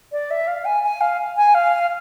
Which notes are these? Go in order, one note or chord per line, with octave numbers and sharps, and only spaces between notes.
D5
E5
F5
G#5
G#5
F5
G#5
F5